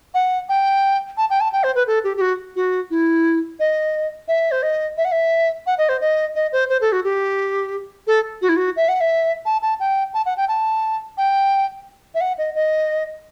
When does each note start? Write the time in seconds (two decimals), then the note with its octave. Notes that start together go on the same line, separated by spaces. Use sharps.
0.14 F#5
0.49 G5
1.17 A5
1.30 G5
1.41 A5
1.53 G5
1.64 C5
1.75 B4
1.87 A4
2.04 G4
2.17 G4
2.21 F#4
2.56 F#4
2.90 E4
3.60 D#5
4.28 E5
4.51 C5
4.63 D#5
4.97 E5
5.05 F#5
5.12 E5
5.66 F#5
5.78 D#5
5.89 C5
6.01 D#5
6.35 D#5
6.52 C5
6.69 C5
6.81 A4
6.92 F#4
7.04 G4
8.07 A4
8.42 F#4
8.49 E4
8.56 F#4
8.76 E5
8.89 F#5
9.01 E5
9.46 A5
9.62 A5
9.80 G5
10.14 A5
10.26 F#5
10.37 G5
10.49 A5
11.18 G5
12.15 E5
12.21 F#5
12.38 D#5
12.55 D#5